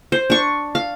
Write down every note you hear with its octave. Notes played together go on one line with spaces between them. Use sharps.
C5
D4 C#6
F5